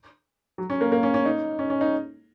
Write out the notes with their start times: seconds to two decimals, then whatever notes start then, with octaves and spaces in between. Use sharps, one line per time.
0.58 F#3
0.70 C#4
0.81 A#3
0.92 A#3
1.03 C#4
1.14 C#4
1.25 D#4
1.59 C#4
1.70 C#4
1.81 D#4